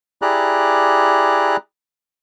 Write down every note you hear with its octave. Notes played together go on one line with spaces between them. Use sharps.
E4 G4 G#4 D5 A#5 F#6